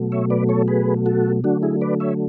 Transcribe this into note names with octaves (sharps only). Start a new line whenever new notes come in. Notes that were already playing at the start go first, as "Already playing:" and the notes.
Already playing: B2 F#3 A3
C#5 E5
B4 D5
A4 C#5
G#4 B4
F#4 A4
D3 F#3 A3 D4 F#4
E4 G#4
B4 D5
C#5 E5